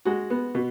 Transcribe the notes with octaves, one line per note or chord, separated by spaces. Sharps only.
G#3 F#4
B3
B2